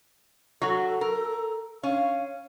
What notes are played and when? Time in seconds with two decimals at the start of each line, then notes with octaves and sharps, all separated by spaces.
0.61 F#3 F#4 A4
1.01 A#4
1.83 C#4 F5